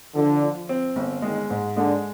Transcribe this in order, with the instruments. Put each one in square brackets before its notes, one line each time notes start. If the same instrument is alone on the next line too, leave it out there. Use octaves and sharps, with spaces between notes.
[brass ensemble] D3 [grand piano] F3
[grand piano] F3
C4
G1
[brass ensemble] D#3 [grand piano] G#3
[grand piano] G#2
[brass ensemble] D3 [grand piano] G#3